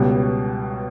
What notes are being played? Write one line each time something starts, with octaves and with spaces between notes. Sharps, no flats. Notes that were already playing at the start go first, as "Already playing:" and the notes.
Already playing: C#2 B2 G3 B3 C#5